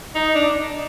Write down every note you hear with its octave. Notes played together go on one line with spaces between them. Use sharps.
D#4
D4